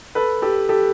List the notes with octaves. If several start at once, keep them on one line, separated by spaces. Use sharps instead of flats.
A4 B4
G4 A4
G4 A4